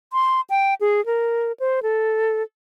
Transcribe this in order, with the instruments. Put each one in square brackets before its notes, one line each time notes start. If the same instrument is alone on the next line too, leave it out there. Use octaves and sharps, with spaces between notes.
[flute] C6
G5
G#4
A#4
C5
A4